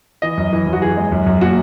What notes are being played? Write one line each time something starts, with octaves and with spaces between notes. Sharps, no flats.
E3 D#5
F#2
E3
F#2
F#4
E3 G#4
G#3
F#2
F#2
A#2 F#4